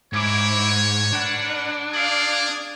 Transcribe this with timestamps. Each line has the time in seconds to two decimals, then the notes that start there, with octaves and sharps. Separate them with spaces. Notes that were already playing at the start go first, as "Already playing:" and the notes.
0.13 G#2 E4 C#5 D6
1.13 D4 A#4 B4 F#5
1.93 F4 G#4 D5 F5